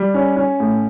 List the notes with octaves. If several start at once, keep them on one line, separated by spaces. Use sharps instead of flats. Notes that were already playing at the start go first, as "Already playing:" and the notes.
Already playing: G3
C#4
C#4
A2